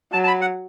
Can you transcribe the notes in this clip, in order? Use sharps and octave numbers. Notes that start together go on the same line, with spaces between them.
F#3 A5
A5
B5
F#5